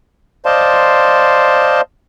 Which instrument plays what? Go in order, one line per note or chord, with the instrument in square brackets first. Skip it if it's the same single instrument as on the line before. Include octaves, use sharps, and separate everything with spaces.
[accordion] C5 D5 D#5 F5 A5 C6